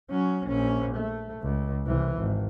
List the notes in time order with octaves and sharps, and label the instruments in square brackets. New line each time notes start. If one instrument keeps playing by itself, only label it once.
[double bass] F#3 C#4
A#1 C#4
A3
C#2
C2 E3
G#1